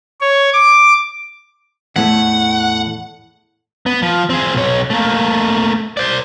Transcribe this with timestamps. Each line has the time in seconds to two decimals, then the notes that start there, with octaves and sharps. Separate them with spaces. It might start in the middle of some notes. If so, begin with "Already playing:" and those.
0.21 C#5
0.53 D6
1.96 E2 A2 A3 F#5
3.86 B3
4.02 F3
4.29 C4 G#4
4.55 B1 C#5
4.90 A3 A#3
5.97 C5 D5